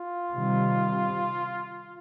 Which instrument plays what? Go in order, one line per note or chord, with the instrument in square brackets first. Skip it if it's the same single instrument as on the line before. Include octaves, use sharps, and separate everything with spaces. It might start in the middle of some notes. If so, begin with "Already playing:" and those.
Already playing: [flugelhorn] F4
[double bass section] C3 D#3 G3